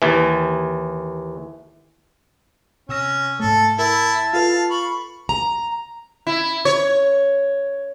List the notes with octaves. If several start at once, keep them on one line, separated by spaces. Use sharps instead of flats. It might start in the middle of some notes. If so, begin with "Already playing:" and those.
D#2 E3
C3 C#4 E6 A#6
G#2 A3 A4
E4 A#4 A5
F4 A4 B4 F5
B5 C#6
A#5
E4
C#5